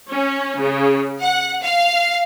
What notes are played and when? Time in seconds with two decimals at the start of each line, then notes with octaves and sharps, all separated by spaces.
0.11 C#4
0.60 C#3
1.20 F#5
1.61 F5